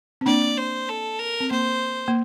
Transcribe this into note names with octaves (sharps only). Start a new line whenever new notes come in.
C4
A#3 D4 D5
C5
A4
A#4
C4
A#3 C5
A#3